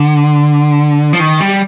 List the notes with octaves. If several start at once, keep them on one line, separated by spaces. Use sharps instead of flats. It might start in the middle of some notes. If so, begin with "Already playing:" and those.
Already playing: D3
F3
D#3
G3